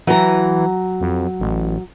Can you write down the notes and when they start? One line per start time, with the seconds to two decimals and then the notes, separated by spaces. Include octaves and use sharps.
0.07 E3 F#3 A#5
1.00 F2
1.40 A1